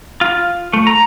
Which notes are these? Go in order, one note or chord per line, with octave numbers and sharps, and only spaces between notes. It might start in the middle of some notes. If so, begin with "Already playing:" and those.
F4
A3
A#5